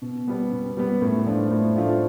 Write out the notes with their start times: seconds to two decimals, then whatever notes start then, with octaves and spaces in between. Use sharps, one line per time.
0.02 B2
0.27 G3 B3
0.52 B2
0.77 G3 B3
1.02 A2
1.26 F3 A3 D4 F4
1.51 A2
1.76 F3 A3 D4 F4